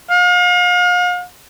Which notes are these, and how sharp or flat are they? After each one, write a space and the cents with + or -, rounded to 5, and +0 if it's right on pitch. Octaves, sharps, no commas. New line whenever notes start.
F5 +40